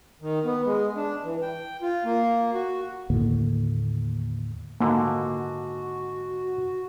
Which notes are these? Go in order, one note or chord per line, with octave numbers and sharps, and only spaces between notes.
D#3
B3
G#3
D4
E3
G5
F4
A#3
F#4
D#2 A2 D3 A#3
G#2 D3 A#3 F#4